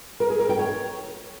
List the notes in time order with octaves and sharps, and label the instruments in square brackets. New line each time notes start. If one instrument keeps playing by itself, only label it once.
[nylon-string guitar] A#4
G#4
A#4
G5
C#5